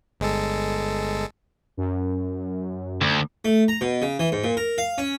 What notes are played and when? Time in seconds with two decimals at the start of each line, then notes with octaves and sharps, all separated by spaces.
0.20 G1 G#3 A4
1.77 F#2
3.01 D2
3.45 A3
3.68 A#5
3.81 B2
4.02 C#3
4.19 E3
4.32 G#2
4.44 A#2
4.57 A#4
4.78 F5
4.98 C#4